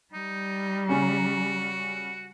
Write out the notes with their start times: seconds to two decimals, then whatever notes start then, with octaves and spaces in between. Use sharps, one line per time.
0.13 G3 D#4
0.89 C#3 C#4 F#4